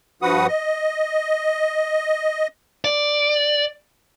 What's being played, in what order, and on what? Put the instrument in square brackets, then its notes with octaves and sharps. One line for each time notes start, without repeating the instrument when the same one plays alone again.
[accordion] G2 F3 F#4 B4 F#5 D#6
D#5
[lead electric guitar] D5